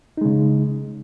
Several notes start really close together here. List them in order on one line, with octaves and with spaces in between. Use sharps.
D#4 G#3 C#3